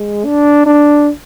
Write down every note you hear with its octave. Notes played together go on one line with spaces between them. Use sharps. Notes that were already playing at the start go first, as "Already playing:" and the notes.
Already playing: G#3
D4
D4